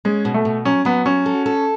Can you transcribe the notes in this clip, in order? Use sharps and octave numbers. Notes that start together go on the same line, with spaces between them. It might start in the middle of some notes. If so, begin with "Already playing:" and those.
G#3 C#4
B2
A3
B2
F#3 C#4
F#3 B3
C#4 F#4
A4
A4